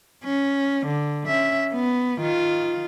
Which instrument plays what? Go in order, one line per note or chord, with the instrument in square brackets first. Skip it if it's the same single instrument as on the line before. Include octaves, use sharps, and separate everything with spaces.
[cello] C#4
D3
C#4 E5
B3
D#3 F4